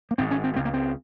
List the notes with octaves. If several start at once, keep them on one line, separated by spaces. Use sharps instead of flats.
A#3
G#1 G#2 C4
C#4
C4
C#2 C#3 C4
A#3
C4